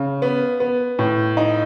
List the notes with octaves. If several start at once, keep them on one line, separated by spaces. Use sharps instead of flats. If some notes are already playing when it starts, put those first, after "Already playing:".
Already playing: C#3
B3
B3
A2
D#4